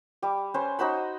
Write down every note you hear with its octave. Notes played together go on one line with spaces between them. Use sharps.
G3 D6
C#4 B4 C5
D#4 F#4 C5 B5